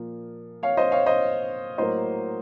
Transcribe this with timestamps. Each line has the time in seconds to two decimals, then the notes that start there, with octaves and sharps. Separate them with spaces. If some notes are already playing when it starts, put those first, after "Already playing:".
Already playing: A#2 F3 A#3
0.63 C#5 F5
0.77 C5 D#5
0.92 C#5 F5
1.06 C5 D#5
1.78 A2 F#3 A#3 C5 D#5